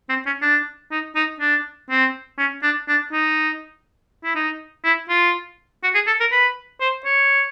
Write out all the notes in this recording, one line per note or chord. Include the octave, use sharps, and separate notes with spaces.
C4
C#4
D4
D#4
D#4
D4
C4
C#4
D4
D4
D#4
E4
D#4
E4
F4
F#4
G#4
A4
A#4
B4
C5
C#5